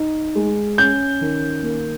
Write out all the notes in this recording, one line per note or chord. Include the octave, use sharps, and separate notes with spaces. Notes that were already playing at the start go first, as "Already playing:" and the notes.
Already playing: D#4
G#3
C#4 G6
D#3
A#3